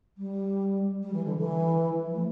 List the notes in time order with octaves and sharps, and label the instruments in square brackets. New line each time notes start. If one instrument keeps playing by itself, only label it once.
[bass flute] G3
G3
E3
D3
E3
F3
A3